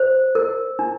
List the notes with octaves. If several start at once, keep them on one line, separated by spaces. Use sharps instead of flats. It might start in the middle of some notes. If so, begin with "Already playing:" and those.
Already playing: C5
A#4
D4